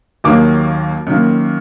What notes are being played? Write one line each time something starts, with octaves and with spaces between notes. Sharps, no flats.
D#2 D#3 F#3 A#3 D6
F#2 D#3 A#3